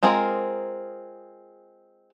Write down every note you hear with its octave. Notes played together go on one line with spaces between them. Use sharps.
G#3 C4 F4 G#4 A#4